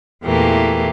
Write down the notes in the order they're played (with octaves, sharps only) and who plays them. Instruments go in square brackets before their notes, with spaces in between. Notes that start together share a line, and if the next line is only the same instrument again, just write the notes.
[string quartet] E2 A#2 E3 A3 A#3 G4